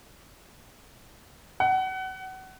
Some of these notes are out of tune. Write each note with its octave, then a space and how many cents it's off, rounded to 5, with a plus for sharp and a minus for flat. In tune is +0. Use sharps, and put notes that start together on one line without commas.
F#5 +25